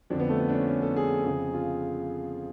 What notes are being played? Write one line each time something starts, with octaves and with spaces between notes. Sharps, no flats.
F2 D3 D4
B3
A3
B3
D4
C#4
C#4
A4
G#4
F2 C#3
F4